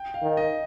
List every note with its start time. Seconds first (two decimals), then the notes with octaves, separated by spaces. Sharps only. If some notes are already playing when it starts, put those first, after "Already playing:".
Already playing: G5
0.14 F5
0.22 D#3
0.37 D#5